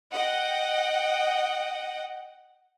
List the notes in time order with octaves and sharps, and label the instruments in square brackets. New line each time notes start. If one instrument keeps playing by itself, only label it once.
[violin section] D#5 F#5 G5